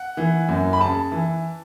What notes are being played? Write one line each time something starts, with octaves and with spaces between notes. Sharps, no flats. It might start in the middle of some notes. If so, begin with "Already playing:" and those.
Already playing: F#5
E3
F#2
B5
C#3 A5
E3